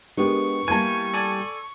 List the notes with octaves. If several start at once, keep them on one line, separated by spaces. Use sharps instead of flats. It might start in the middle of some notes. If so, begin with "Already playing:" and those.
G#3 B3 D4 G4 A#4 C#6
G3 A#3 E4 G#5 A5 G#6
A4 D5 G#5